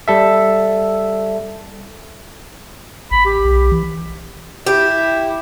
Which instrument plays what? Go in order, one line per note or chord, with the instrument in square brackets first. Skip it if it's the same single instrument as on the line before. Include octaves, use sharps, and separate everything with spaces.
[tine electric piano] G3 A4 E5
[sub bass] A1 [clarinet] B5
[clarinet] G4
[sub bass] B1
E3
[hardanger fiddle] E4 [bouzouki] G4